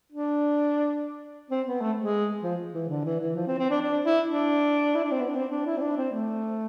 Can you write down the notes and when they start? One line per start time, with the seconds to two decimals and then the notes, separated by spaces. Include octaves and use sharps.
0.12 D4
1.51 C4
1.67 B3
1.81 A3
1.97 G#3
2.43 F3
2.74 E3
2.89 D3
3.05 E3
3.20 E3
3.35 F3
3.47 C4
3.58 C4
3.70 D4
3.81 D4
4.05 E4
4.28 D4
4.95 E4
5.04 D4
5.11 C4
5.20 B3
5.28 D4
5.35 C4
5.51 D4
5.66 E4
5.77 C4
5.81 D4
5.97 C4
6.12 A3